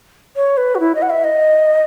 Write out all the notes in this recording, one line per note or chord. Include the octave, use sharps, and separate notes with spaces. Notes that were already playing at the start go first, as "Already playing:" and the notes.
C#5
B4
F#4
E4
D#5
F#5
E5
D#5